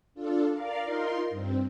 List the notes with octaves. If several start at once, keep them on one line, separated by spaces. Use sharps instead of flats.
D4 F4 A4
A#4 D5 F5
D#4 F4 A#4 C6
G2 C4